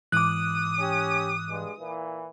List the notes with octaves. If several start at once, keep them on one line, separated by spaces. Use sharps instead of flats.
G#2 E3 D6 D#6 F#6
C#4 G4
G2 G#3
A#2 E3